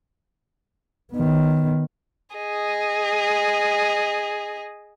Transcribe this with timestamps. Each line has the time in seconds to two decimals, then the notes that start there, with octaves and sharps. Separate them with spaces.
1.13 D#3 B3
2.36 G#4 D#5